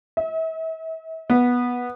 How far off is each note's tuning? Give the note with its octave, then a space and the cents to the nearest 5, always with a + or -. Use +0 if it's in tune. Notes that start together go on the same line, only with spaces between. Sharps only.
E5 -40
B3 -10